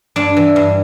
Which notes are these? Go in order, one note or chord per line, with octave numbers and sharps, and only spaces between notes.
G2 D4
E3
G2